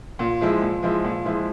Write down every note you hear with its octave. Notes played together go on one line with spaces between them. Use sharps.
A#2
F3 G#3 E4
A#2
F3 G#3 E4
A#2
F3 G#3 E4